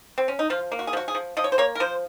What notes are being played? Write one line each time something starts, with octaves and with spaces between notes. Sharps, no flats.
C4
C#4
D#4
F3 F4
A#3
F#4
G#4
F3 F#4
G#4
F3
F3 D#5
C#5
C5
A#3 C#5
A#4
F3 C5